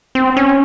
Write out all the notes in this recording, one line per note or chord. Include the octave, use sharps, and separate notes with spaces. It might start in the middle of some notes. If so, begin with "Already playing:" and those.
C4
C#4